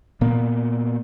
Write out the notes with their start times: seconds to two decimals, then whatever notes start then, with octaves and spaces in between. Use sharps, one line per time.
0.21 A#2 A#3 B3